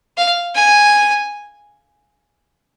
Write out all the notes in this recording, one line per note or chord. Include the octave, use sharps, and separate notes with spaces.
F5
G#5